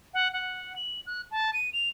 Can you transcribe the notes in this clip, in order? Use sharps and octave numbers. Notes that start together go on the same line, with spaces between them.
F#5
F#5
F#7
F#6
A5
D#7
F7